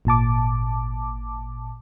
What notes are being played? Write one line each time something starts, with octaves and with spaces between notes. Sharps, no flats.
G#1 A#2 A5 D6